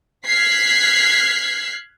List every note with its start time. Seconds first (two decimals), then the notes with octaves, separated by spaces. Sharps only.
0.25 F6 F#6 G#6 B6 C7